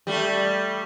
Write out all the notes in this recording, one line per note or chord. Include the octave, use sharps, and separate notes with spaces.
G3 A3 G4